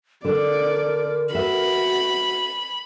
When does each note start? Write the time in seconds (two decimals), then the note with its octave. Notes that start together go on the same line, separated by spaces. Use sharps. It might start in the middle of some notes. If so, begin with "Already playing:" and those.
0.25 D3 D4 A#4 D5
1.35 F#4 B4 E5 B5